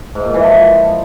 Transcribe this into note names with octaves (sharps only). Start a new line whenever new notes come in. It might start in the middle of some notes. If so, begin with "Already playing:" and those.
G#2
A#2
E3
F3